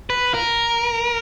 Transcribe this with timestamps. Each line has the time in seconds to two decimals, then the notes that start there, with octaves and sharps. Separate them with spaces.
0.10 B4
0.34 A#4